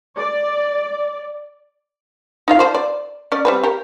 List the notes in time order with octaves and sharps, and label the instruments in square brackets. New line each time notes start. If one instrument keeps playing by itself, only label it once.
[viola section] D5
[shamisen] D#4 F4 F5
F3 C5 D5
D5
C#4 D5 D#5
G3 C4 B4
G4 A#4